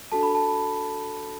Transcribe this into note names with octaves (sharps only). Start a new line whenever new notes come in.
D4 F#4 A4 A5
B5
A5